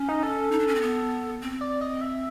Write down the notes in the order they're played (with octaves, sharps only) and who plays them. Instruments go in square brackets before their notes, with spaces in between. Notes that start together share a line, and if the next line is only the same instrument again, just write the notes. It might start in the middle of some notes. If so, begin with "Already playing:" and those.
Already playing: [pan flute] C#4
[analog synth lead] D#4
A4
[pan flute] D#4
D4
C#4
C4
B3
C4
[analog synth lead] D5
D#5
E5